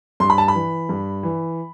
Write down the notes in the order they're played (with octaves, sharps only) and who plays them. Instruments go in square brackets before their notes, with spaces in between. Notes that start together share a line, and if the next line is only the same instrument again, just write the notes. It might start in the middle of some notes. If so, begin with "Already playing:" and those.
[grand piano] G2 C6
B5
A5
B5
E3
G2
E3